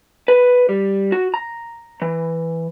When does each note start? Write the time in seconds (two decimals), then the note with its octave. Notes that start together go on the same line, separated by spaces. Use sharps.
0.28 B4
0.69 G3
1.12 F#4
1.34 A#5
2.02 E3